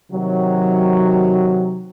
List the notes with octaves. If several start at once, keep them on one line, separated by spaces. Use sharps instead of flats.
C3 D#3 F#3